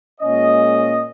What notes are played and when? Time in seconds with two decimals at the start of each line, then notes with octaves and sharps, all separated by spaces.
0.20 A#2 G#3 C#4 D#5